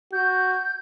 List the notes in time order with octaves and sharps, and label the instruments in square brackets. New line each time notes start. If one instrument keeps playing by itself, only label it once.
[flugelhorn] F#4 [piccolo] G6